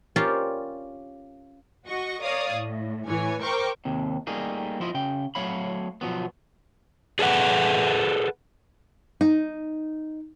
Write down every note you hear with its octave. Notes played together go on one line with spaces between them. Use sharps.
C#4 F4 G4 A#4 C5 D5
F#4 D#5 C#6
A#4 C#5 D5 F5 D#6
A2
A2 E3 C#5 G#5
A#4 C5 G5 C#6 D6
D#2 C3
G3 A3 A#3 D#4 G#4
F3 E4 F4 D#5
C#3 G5
F#3 A3 C#5 F5 B5
B2 F3 F#3 B3
G#4 A4 B4 F#5
D#4